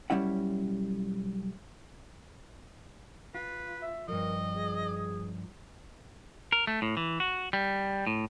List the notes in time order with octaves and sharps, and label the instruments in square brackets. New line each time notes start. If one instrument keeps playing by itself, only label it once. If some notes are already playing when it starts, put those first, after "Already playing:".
[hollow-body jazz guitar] B1 G2 G3 C#4 E4 F#5
[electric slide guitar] F4 [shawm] B4
[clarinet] E5
[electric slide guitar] G2 F3 [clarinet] A#4 [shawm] D#5
[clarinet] G#4
[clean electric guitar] A#4
A3
A2
E3
F#4
G3
A2